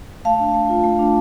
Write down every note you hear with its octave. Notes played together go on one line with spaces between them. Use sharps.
A3 F5 A5
D4
A3
F4
A3
D4